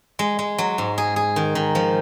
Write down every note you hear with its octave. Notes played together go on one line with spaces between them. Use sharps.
G#3
G#3
F#3
G#2
G#4
G#4
D#3
D#3
F3